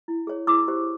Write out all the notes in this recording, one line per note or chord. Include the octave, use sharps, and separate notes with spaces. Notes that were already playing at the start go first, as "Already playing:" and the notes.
E4
G#4 C#5
E4 D6 E6
G4 C5